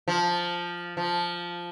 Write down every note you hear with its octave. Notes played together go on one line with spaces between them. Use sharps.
F3
F3